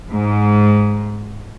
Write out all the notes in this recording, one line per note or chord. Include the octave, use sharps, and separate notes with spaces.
G#2